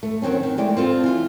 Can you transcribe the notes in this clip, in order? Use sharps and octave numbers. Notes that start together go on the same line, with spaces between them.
A3
D#3 F#3 C4 C#4
D#3
E3 G#3 A3 D5 G5
C4 F4 A4
E3 F4